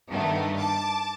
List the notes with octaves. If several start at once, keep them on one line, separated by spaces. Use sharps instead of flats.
G2 D#3 A3 B3
A5 D6